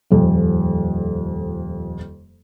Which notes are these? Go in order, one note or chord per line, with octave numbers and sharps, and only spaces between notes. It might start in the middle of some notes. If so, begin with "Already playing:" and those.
D#1 F2